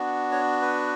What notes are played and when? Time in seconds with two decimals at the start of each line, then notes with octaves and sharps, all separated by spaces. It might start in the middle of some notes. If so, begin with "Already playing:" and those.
Already playing: B3 D4 F#4
0.31 C#5
0.62 B4